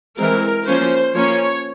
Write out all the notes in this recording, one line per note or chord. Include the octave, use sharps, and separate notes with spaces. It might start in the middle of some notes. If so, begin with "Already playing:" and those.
E3 G#3 C4 A#4
F3 A#3 C#4 C5
F3 A#3 C#4 C#5